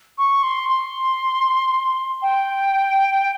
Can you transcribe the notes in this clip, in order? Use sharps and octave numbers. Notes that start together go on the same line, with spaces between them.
C#6
C6
C6
G5